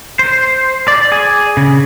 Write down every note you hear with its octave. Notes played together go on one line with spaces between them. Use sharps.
C5
D5
G#4
C#3